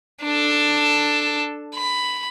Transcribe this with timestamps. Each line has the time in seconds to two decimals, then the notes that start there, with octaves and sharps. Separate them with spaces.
0.24 D4 A4
1.76 B5